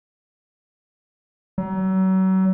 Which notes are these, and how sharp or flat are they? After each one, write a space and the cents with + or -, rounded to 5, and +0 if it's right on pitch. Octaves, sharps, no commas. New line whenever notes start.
F#3 +35